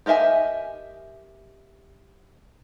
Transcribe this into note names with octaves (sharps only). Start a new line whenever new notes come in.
G4 A#4 D#5 E5 G#5